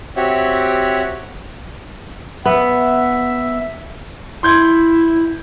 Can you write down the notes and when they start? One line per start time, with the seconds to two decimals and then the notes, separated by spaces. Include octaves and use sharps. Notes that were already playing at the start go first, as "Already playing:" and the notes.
0.16 C4 F#4 G4 C#5 E5 F#5
2.45 B3 E5 F#5
4.43 E4 C6 G6 G#6